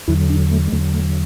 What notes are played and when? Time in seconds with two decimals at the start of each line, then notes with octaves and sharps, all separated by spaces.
0.08 E2 D3 F#3 E4
0.30 D4
0.52 A3
0.68 G#3
0.72 E2 D3 F#3 A3
0.94 A3